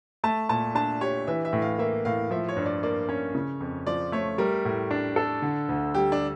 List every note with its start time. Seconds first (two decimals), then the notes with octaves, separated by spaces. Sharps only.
0.24 A3 A5
0.49 A#2 A5
0.75 D4 A5
1.01 G4 C#5
1.27 E3 E5
1.45 E5
1.53 A2
1.62 F5
1.79 A#3 E5
2.05 A2 F5
2.31 F3 E5
2.49 C#5
2.56 G2
2.66 D5
2.83 A#3 D5
3.09 C#4 C#5
3.35 C#3
3.60 F2
3.87 F3 D5
4.12 A3 C#5
4.38 G3 A#4
4.65 A2
4.91 D4
5.16 A4
5.42 D3
5.69 D2
5.94 G3 G4
6.12 D4